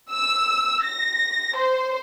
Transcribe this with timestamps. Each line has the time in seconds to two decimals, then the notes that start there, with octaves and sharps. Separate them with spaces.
0.12 E6
0.85 A#6
1.56 C5